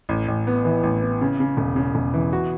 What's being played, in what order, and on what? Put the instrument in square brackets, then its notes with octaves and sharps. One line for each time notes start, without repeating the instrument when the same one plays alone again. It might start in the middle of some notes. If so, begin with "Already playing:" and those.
[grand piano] A1
A1
B3
E3
A1
B3
C#3
C#3
E1
C#3
E1
E3
F#4